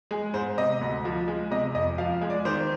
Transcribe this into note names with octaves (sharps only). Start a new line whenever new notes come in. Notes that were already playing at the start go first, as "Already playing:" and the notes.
G#3 G#4
G#2 C5
C3 D#5
D2
F3
G#3
C3 D#5
F2 D#5
F3 F5
G#3
D5
D#3 C5